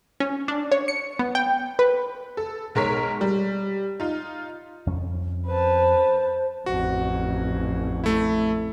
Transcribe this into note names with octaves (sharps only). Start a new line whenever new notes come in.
C#4
D4
C#5
C#7
B3
G5
B4
A4
B1 G#3 A#4 C#5 B6
G3
D#4 F4
F2 C#4
B4 C5 A5
A1 F2 F#4
A3 E4